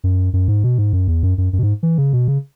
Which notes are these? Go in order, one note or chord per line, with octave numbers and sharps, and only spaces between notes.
F#2
F#2
G#2
B2
G#2
F#2
E2
F#2
F#2
F#2
B2
G#2
E3
C#3
B2
C#3